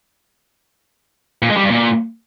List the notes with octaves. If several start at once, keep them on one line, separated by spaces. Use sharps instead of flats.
A#2
G#3
G3
G2
A#2